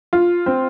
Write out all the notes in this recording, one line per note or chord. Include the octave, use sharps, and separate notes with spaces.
F4
C4